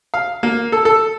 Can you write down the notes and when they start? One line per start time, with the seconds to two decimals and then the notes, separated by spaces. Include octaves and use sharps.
0.14 F5
0.43 A#3
0.72 A4
0.85 A4